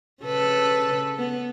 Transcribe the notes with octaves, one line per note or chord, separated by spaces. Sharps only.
C#3 A4 B4
B3